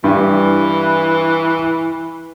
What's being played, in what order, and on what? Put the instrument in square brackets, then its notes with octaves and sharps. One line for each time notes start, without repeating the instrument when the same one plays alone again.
[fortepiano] G2 [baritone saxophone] E3